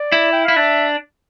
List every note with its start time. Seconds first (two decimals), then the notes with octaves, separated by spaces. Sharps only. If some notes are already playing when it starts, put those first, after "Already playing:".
Already playing: D5
0.12 E4
0.32 G5
0.44 E4 F5
0.56 D4 E5